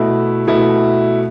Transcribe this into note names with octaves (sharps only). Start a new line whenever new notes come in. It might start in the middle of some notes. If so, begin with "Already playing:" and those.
Already playing: B2 A3 E4
B2 A3 E4